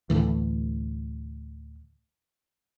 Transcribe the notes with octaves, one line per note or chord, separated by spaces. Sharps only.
D2 A2 E3